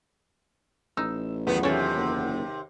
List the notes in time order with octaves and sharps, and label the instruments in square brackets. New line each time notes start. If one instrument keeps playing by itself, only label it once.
[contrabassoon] A1 [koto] D#4 [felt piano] E6
[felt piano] E2 F#3 F4 [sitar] D#3 B3
[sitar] D#2 C3 [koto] C#4 A4
[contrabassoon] F#1